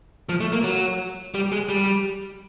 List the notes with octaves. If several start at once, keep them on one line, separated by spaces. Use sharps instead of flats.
F3
A3
A#3
F#3
G3
G#3
G3